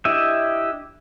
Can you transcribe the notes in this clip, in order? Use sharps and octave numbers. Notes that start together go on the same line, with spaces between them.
D4 E4 G4 D#5 E5